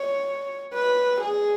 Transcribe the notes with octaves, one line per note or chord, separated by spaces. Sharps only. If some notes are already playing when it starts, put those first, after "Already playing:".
Already playing: C#5
B4
G#4